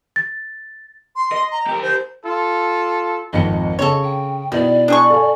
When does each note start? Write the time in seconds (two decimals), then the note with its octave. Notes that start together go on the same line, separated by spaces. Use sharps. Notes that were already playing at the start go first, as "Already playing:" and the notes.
0.16 A6
1.16 C6
1.32 D#5
1.52 A#5
1.67 G4 A#4
1.82 C5
2.26 F4 A4
3.33 G#1 F2 D#5 C#7
3.79 C#3 A4 C#5
4.03 G5
4.52 B2 D#3 E4 D5
4.88 D4 G#4 C#6
5.10 A4 F5 G#5